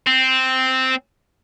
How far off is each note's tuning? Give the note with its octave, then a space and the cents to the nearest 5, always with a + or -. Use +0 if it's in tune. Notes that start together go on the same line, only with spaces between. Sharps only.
C4 -5